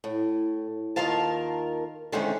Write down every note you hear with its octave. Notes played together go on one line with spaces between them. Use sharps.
A2
D#2 D#3 F4 A#4 F5 A5
D3 D#3 G#3 A3 C4 C#4